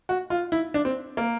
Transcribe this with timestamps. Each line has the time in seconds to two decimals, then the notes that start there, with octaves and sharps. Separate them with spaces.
0.09 F#4
0.30 F4
0.52 E4
0.74 D4
0.85 C4
1.17 A#3